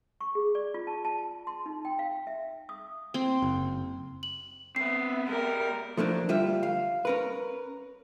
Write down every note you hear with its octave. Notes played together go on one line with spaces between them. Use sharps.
C#6
G#4
D5
F4
A5
A5
C6
D#4
G5
F5
E5
D#6
C4
F#1
F#7
B3 C4 B4 E5 C7
G#3 G4 A#4
F3 A3 A#3 D4
D2 G3 F4 E5
F5
C#4 A#4 B4